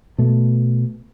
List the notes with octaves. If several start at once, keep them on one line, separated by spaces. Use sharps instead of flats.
B2 A3